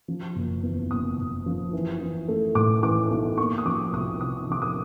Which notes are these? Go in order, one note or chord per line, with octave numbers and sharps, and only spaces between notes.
F3
F#1
E2
F#1 D#6
F#1
F3
E3
E3
A3
A2 D6
E3 D6
B1
A#3 C#6
D#6
F3 D6
C2 D#6
C3 D#6
F3 D6
D#6